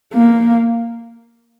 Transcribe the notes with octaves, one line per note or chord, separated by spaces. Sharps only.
A#3